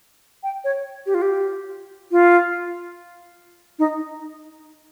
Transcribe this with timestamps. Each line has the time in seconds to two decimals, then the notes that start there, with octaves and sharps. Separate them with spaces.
0.43 G5
0.64 C#5
1.06 G4
1.14 F4
1.22 G4
2.12 F4
3.79 D#4